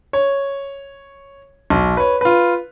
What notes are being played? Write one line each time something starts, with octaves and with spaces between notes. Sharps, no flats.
C#5
B1
B4 C#5
F4 B4